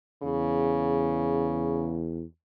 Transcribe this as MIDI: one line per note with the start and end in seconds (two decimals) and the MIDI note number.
0.23 2.24 40
0.23 2.02 49